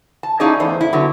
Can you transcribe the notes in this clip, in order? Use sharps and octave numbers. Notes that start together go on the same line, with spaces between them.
A5
A#3 C#4 D#4 E4 G#4 D5
E2 A3 C5
E4
D3 F#3 B3